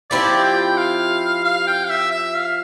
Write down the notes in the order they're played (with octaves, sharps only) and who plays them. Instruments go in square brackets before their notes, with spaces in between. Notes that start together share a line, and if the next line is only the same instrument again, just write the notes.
[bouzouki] F3 C4 E4 G4 [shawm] D5
[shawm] G5
F5
F5
G5
F5
E5
E5
F5